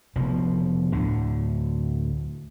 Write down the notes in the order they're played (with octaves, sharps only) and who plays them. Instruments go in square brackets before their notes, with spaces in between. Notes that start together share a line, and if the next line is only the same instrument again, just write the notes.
[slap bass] F1 B2 F3
D2 A2 D3